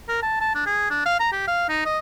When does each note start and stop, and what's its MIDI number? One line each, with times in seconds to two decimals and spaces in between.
0.09 0.20 70
0.23 0.40 81
0.41 0.51 81
0.55 0.66 62
0.66 0.90 68
0.90 1.02 62
1.06 1.16 77
1.20 1.30 82
1.32 1.44 67
1.48 1.67 77
1.69 1.83 63
1.86 1.99 75